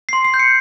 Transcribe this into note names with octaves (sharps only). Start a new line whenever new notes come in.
C6 C7
C7
G6
C#7